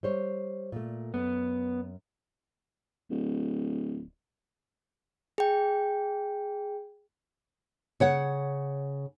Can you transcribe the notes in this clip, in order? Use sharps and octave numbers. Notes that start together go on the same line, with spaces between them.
G3 C5 C#5
A#2 A3
F#2 B3
D1
G#4 G5
C#3 C#5 F#5